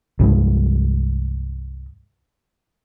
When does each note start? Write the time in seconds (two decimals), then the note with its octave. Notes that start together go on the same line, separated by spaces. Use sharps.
0.19 C2 G2 F3 G#3